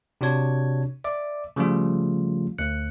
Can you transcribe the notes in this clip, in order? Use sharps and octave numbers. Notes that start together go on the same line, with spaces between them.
C3 D4 F#4 C#5 G#6
D5 E5 D6
C#3 F3 G3 A3 F4
D2 F#6 C#7